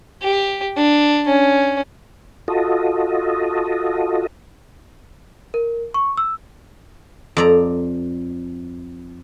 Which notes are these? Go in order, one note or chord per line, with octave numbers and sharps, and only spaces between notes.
G4
D4
C#4
F4 F#4 A4 D#5
A#4
C#6
E6
F2 D5 A#5